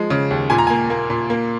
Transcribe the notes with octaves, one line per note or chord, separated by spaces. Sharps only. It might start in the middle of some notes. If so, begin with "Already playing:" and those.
Already playing: F3 G#3
C#3
D#2
A#2 G#5
A#5
A#3 G#5
A#3
A#2
A#3